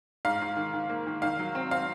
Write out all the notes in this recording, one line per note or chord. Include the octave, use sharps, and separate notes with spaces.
G#2 F5
G#2
D#3
D#3
A#3
D#3
D#3 F5
F#3
C4
C4 F5